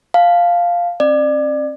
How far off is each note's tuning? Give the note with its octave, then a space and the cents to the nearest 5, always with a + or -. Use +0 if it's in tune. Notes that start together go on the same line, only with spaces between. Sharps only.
F5 +0 A5 -15
C4 +40 D5 +25